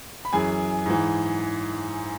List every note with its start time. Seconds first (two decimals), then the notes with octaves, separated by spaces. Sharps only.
0.25 B5
0.33 F#2 E3 G#4 G#5
0.86 G#2 E3